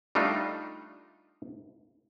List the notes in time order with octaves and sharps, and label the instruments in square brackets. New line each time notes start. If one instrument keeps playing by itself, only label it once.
[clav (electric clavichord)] G3 A3 D4 D#4 F4